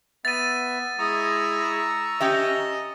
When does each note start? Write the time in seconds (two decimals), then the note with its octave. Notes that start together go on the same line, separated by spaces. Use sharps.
0.25 B3 E5 A6 D#7
0.99 G#3 E4 A#5 C#6 D#6 E6
2.20 C#4 G4 D#5 E5